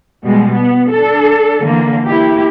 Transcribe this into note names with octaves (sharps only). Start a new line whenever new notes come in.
B2 G3 G#3
B3
D4 A4
D3 E3 A#3
A#3 E4 G4